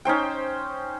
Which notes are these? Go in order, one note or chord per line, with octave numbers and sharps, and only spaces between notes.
C#4 D#4 C5 G5